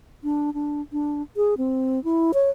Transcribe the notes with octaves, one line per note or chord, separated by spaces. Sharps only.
D4
D4
D4
G#4
C4
E4
C#5